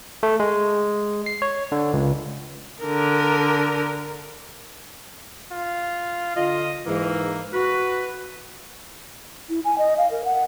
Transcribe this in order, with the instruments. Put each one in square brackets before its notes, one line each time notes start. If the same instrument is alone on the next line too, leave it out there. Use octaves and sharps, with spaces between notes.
[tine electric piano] A3
G#3
C7
C#5
D3
C#2
[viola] D3 A#4
[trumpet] F4
[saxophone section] D3 F4 [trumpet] D#5
[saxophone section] G#2 E3 [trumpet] A#3
[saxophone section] F#4 [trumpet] B4
[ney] E4
G#5
D#5
F5
A#4
F#5